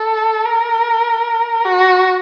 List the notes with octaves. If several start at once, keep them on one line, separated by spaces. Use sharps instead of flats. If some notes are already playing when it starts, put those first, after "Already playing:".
Already playing: A4
A#4
F#4